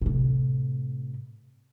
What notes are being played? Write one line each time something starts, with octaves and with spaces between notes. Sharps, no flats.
A2 C3